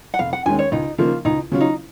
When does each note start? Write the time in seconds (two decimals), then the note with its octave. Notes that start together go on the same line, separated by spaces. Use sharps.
0.14 F#5
0.19 F1 F5
0.33 F#5
0.46 D#2 D#3 G#3 C#4 G#5
0.59 C#5
0.72 C#2 D#4
0.98 C#3 F3 A#3 D#4 F4
1.25 C#2 D#4
1.52 C#3 F#3 C#4 F4
1.61 D#4